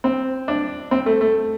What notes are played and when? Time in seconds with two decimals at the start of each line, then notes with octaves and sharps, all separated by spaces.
0.04 C4
0.48 D4
0.91 C4
1.06 A3
1.21 A3